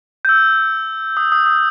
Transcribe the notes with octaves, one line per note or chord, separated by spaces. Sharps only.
G6
E6
D#6
D#6
D#6